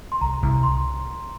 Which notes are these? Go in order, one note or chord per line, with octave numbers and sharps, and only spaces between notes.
C6
C2 A#5
C2
C6